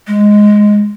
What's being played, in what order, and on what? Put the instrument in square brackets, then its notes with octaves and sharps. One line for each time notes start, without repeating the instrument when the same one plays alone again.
[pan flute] G#3